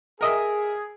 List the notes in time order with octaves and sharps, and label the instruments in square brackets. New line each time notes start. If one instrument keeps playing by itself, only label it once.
[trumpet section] G#4 [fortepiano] A#4 D#5 E5